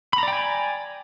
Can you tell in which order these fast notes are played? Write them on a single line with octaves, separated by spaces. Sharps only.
B5 A#5 D5 G5 G#5